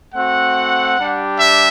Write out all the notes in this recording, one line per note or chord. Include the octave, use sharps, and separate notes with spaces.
A3 C4 F#4 F#5
G3 D4 G4
E5